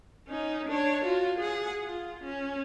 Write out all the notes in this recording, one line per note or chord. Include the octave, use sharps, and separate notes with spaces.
C#4 D#4
D4 C#5
F4 F#4
G#4 F#5
F4
C#4